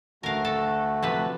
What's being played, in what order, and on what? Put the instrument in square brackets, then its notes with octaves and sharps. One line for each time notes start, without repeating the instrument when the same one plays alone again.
[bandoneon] D2 A3 F#4 [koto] A#4 F5
[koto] A4
C3 F3 B4